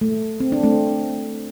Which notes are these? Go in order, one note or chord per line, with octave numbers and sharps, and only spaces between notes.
A3
C4
D4
A3 C4